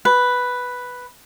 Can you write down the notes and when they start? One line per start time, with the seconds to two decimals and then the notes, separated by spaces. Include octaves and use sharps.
0.05 B4